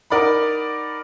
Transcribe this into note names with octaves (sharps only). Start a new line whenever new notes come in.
D#4 A#4 D5 F#5 B5